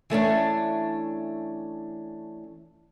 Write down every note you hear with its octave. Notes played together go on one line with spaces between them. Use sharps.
E3 A3 C#4 D4